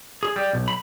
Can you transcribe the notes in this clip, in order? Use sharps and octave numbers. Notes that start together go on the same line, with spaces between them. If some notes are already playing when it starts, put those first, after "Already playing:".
G#4
G3
B1
B5